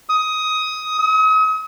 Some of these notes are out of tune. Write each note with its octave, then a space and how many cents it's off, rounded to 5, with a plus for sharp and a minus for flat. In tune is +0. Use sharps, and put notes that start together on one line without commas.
D#6 +15
D#6 +40